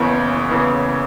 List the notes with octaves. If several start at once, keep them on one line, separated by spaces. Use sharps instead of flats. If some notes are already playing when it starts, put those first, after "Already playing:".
Already playing: F#1 E2 C#3
F#1 E2 C#3